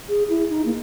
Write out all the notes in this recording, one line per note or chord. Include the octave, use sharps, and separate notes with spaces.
G#4
E4
D#4
A#3